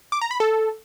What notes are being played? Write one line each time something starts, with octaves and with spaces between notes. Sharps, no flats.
D6
A#5
B5
A4